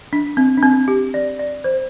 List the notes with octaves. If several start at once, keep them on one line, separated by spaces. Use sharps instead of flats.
D4
C4
D4
C4
G4
D5
D5
C5